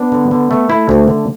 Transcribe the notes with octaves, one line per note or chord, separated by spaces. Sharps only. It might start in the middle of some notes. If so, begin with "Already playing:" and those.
Already playing: B3 D4
D3
D3
A3
A3 E4
D2
D3